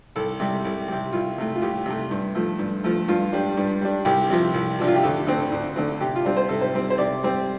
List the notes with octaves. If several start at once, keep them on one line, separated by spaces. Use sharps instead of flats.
C2 A4
C3 G3
C2
C3 G3
C2 F4
C3 A3
F4
C2 G4
C3 A3
G2
F3 A3
G2
F3 A3
G2 F4
G3 D4
G2
G3 D4
C2 G4
C3 F3
C2
C3 F3 D4
F4
G4
D2 A4
D3 A3 C4
D2
D3 A3 C4
C3 G4
F4
G3 C4 D4
C5
C3 A4
C5
G3 C4
C5
C3 D5
G3 C4